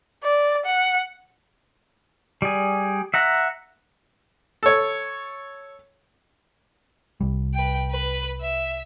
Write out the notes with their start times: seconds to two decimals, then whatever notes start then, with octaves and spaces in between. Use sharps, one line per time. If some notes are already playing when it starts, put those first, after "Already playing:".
0.24 D5
0.65 F#5
2.42 G3 G#4
3.14 E5 F#5 A#5
4.63 A4 C#5
7.21 C2 G3
7.54 B4 G5
7.91 B4
8.41 E5